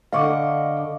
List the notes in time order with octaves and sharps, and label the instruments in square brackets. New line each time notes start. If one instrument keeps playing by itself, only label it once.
[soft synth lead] D3 [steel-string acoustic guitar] D#5 F#5 [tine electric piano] F5 C#6 D6